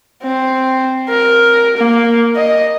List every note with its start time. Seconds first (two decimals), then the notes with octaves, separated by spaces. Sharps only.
0.23 C4
1.09 A#4
1.77 A#3
2.36 D#5